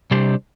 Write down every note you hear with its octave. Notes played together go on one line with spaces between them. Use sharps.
C3 G3 D4 G4 C5